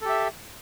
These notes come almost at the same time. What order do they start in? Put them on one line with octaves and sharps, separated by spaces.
A4 G4 E5